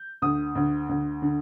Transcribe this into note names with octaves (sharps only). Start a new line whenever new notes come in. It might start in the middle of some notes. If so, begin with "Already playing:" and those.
Already playing: G6
D2 D#6
D2
D2
D3